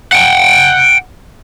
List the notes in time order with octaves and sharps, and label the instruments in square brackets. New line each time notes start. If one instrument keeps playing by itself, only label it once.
[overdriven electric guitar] F#5 G5